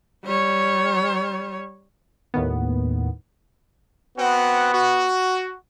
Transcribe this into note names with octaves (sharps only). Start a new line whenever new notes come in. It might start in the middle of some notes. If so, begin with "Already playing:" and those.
G3 C#5
D#2 A2 D#3 B3
B3 C4 F#4 F#5
F#4